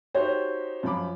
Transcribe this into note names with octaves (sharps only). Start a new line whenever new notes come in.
D#4 F#4 G4 C5 C#5
F#2 F3 B5 D6